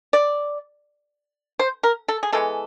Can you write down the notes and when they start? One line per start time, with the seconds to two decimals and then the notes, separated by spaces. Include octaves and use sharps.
0.13 D5
1.59 C5
1.83 A#4
2.08 A4
2.23 G#4
2.33 E3 G#3 B3 A4